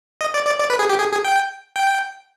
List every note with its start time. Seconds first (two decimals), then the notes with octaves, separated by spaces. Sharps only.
0.21 D#5
0.34 D5
0.47 D5
0.60 D5
0.70 B4
0.79 G#4
0.89 G4
0.99 G#4
1.12 G#4
1.24 G5
1.76 G5